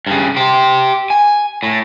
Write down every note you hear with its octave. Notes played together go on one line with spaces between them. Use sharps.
G2 C#3
G4 C5
G#5
A2